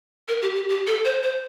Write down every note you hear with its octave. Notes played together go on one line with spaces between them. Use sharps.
A#4
G4
G4
G4
A4
C5
C5